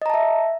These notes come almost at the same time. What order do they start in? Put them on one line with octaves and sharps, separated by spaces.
D#5 A#5 A5 E5